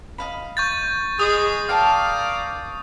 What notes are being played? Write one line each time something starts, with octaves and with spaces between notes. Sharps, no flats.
D#5 F5 B5
C#6 G6 A6
G#3 G#4 D#6
A#4 D5 F5 G5 A5